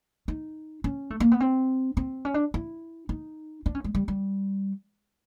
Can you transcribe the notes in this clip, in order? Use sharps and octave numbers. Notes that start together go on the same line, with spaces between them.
D#4
C#4
A3
A#3
B3
C4
C4
C#4
D4
E4
D#4
D4
C#4
G#3
G3
G3